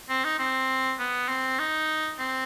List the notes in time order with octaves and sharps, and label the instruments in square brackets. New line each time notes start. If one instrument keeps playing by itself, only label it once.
[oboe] C4
D#4
C4
B3
C4
D#4
C4